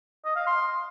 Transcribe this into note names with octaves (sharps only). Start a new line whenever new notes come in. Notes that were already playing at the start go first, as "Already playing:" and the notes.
D#5
F5
C6